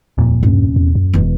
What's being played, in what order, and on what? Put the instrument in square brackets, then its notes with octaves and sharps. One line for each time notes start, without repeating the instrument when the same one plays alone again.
[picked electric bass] D#1 F2 A#2
[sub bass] G2 [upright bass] C3 C#4
[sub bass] E2
F#2
[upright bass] E1 E3